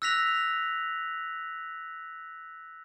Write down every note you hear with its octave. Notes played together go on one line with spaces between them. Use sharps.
E6 F#6 A#6 B6 F7